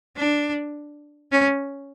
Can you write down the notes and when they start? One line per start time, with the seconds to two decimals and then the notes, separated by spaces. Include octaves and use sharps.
0.16 D4
1.32 C#4